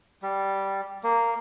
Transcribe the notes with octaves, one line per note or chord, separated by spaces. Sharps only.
G3
A#3